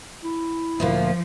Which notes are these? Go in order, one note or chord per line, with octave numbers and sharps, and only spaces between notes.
E4
D2 A#2 F3 A#3